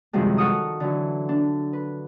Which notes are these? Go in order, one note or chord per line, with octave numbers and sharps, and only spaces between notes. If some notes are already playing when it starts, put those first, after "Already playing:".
F#2 C3 D#3 F3 G3 G#3
F#4 A4 F#5 C#6 D#6 F6
D3 E3 F#3
D4
B4